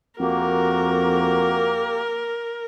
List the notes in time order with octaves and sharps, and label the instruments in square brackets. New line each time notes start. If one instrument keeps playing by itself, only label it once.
[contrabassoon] F2 [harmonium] A#3 G4 [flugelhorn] F#4 [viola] A#4